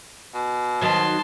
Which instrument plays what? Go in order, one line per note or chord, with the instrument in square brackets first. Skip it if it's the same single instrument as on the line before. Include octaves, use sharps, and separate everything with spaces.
[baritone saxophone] B2
[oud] D#3 F#3 [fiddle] A5 C6